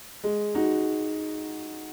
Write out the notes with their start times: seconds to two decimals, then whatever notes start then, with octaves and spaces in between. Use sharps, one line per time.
0.24 G#3
0.55 D#4 F#4